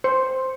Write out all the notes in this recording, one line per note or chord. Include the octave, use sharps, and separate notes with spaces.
C5